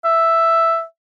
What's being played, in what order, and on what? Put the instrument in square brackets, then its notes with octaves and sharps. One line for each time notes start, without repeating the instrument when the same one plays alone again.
[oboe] E5